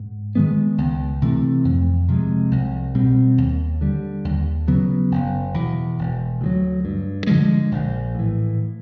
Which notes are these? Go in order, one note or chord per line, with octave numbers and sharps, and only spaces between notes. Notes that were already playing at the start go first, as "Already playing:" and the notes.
Already playing: G#2
D#3 G#3 B3
C#2
C3 E3 A3
F2
C3 F3 G#3
C2
B2 G3 C4
D#2
D3 G3
D#2
C#3 F#3 B3
F#1
E2 B2
E1
D2 D3 F#3
G2
D3 F3 G#3
A#1
A2 E3